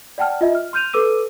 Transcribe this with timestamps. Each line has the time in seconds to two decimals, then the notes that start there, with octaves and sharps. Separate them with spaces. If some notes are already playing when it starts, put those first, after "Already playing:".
0.18 D5 F#5 G5 A5 F6
0.41 F4 D#5 E5
0.55 F6
0.73 C6 F6 G6 D#7 F7
0.93 A4 B4 D6 E6 D#7